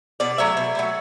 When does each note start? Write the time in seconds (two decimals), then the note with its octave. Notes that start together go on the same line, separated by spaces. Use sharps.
0.20 B2 D5
0.38 F#3 A3 E5
0.57 B2
0.75 F#3 A3